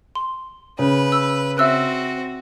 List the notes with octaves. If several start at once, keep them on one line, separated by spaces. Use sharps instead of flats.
C6
C#3 B4
E6
C4 F#4 E5 E6 F#6